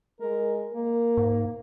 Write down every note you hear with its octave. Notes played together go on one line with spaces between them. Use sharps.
G#3 A#4
A#3 A#4
G#2